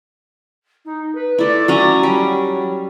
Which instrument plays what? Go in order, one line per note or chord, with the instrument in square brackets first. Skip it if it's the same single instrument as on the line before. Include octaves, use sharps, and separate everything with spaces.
[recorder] D#4
B4
[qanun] A3 E4 [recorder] D5
[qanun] F#3 C#4 A#5
[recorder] F#3 [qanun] G3